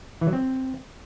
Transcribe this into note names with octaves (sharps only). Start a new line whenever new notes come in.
E3
F#3
C4